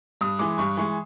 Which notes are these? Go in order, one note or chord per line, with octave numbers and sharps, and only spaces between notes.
G2 D#6
E3 G#3 D6
G2 C#6
E3 G#3 C#6